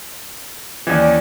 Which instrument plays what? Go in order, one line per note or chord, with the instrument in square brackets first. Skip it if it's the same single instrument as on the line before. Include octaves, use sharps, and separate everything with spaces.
[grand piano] D#2 E3 [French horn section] C#4 D5